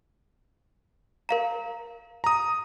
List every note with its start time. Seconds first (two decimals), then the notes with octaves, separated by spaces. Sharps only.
1.29 A#4 F5 A#5
2.24 A#5 D#6